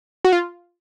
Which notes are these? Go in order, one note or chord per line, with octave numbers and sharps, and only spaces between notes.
F#4
F4